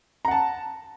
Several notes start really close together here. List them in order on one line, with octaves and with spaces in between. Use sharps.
A#5 F#5 A5